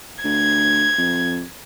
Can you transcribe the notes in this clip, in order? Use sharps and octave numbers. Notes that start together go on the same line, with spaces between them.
D2 G#6
F2